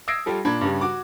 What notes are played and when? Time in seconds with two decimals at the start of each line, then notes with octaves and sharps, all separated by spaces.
0.08 D#6 E6 G#6 A#6 C7 D7
0.26 G3 F4 A4
0.45 A#2 D4 B5 G#6
0.61 G2 C#3 G3
0.81 F#4 D6